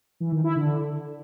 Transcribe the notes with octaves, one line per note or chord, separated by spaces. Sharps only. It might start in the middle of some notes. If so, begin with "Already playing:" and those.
E3
D#3
E4
D3